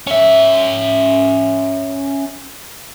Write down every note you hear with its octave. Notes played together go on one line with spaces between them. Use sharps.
C#4 E5